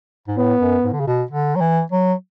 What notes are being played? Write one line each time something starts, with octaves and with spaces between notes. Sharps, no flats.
G#2
A2 B3
F#2
G#2
D3
C#3
B2
D3
F#3
E3
F#3